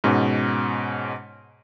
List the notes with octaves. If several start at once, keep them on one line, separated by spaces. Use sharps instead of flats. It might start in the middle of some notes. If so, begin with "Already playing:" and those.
G#2 B2 C#4